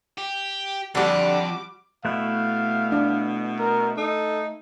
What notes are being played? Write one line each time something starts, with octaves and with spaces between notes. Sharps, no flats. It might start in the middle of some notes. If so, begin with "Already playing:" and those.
G4
F2 D3 G3 D4 F#4 D6
B2 A3 E4 F5 F#6
D4
A#4
D#4 A4